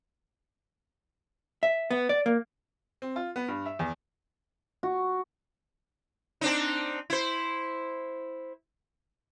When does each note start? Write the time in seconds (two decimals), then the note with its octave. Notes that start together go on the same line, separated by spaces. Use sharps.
1.63 E5
1.91 B3
2.09 D5
2.26 A#3
3.02 C4
3.16 F4
3.36 B3
3.48 G2
3.66 E5
3.79 E2
4.83 F#4
6.41 C4 D4 D#4
7.10 E4 C5